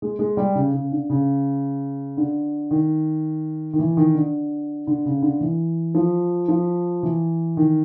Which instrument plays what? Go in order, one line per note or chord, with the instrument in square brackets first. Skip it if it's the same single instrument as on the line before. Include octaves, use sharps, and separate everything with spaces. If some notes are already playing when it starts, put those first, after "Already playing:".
[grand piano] G#3
G#3
G3
C#3
C#3
D3
C#3
D3
D#3
D#3
E3
D#3
D3
D3
C#3
D3
E3
F3
F3
E3
D#3